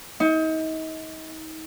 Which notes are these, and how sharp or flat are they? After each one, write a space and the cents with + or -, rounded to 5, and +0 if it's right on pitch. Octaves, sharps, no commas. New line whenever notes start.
D#4 +35